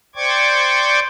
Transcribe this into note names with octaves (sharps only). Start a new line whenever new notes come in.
C5 D5 G5 C#6 D6 G#6